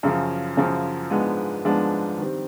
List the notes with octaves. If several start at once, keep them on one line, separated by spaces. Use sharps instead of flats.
F#2 C#3 F3
F#2 C#3 F3
G#2 F3 G#3 B3 D4
G#2 F3 G#3 B3 D4
D#3 G3 C4